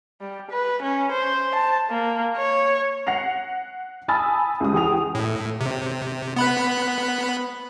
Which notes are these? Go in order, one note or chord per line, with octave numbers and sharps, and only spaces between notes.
G3
B4
C#4
C5
A5
A#3
C#5
F#5 A#6 C7 F7
G#5 A5 B5 D#6 E6 A6
C#2 G3 D#6
E2 G#4 G5 D#6 F7
A2
C3
B3 B5 F#6